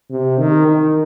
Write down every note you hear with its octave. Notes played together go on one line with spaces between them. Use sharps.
C3
D#3
D#3